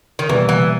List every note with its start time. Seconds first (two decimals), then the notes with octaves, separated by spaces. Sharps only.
0.19 D#3
0.29 B2 E3 G3 A#3
0.49 E3